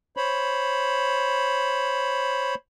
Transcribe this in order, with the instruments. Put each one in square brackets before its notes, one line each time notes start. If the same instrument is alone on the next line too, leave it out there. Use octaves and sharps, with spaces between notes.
[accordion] C5 C#5 B5